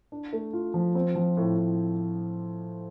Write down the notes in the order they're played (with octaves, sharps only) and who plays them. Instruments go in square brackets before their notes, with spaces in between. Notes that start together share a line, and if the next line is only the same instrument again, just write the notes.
[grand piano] D4
A3
F4
F3
C4
F3
A2
A2